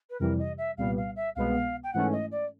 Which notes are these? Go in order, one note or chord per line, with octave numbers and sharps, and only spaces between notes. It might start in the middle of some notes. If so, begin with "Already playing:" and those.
B4
F2 C3 E3 G3 A#4
D#5
E5
C2 A#2 G3 B3 F5
F5
E5
C2 B2 G#3 B3 F5
G5
G#2 E3 A3 C#4 F#5
D#5
D5